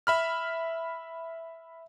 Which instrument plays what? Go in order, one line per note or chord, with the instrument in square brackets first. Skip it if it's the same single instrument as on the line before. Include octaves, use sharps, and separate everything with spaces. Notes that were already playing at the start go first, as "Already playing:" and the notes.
[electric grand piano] E5 B5 F6